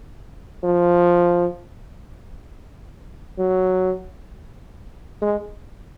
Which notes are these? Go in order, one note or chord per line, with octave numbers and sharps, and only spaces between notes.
F3
F#3
G#3